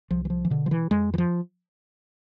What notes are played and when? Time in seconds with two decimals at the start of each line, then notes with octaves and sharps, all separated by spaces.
0.11 C2 F3
0.25 E3
0.30 F3
0.45 E3
0.50 B2 D3
0.66 F3
0.71 E3
0.91 F2 G#3
1.14 E3
1.18 F3